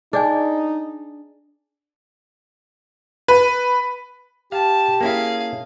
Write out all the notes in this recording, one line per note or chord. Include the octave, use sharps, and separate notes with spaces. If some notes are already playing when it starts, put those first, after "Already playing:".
D4 D#4 G#4 D5 G#5
B4
G4 F5 A5
A#3 C#4 E4 G#4 F5